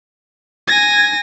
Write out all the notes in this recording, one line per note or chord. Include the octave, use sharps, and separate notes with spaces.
G#5 G#6 A#6